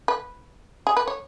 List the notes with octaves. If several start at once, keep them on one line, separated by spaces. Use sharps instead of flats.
B4
G#4
B4
C#5